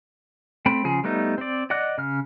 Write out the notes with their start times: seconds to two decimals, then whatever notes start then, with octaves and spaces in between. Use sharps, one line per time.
0.66 A3 C4 G5 B5
0.84 C#3 F3 G#4
1.04 G3 A3 B3 D#4
1.38 C4 D5
1.70 D5 D#5 F#5 D6 F#6
1.98 C#3 F6